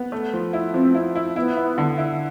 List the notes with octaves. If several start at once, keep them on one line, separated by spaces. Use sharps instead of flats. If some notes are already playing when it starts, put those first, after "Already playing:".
Already playing: B3
A3
F3
E4
F3 C4
E4
E4
B3 E4
E4
D3
E4